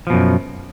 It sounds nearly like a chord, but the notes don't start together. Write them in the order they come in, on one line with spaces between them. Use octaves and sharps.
F3 B2 F#2